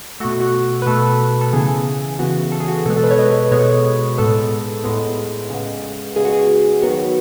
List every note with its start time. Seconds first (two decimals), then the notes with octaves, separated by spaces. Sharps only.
0.20 B2 A3 F#4
0.40 F#4
0.82 B4
0.86 B2 A3 A4
1.41 A4
1.53 C#3 E3 B3 G#4
2.19 C#3 E3 B3 F#4
2.52 A4
2.60 G#4
2.68 F#4
2.75 G#4
2.85 B2 G#3 B3 A4
2.96 A4
3.04 B4
3.11 C#5
3.19 D#5
3.52 B2 G#3 B3 C#5
4.18 A2 G#3 B3 A4
4.84 A2 G#3 B3
5.50 C#3 G#3 B3
6.16 C#3 G#3 B3 G#4
6.25 F#4
6.33 G#4
6.82 D#3 F#3 B3 F#4